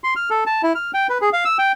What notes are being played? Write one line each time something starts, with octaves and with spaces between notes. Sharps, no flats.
C6
F6
A4
A5
E4
F6
G5
B4
G#4
F5
E6
G5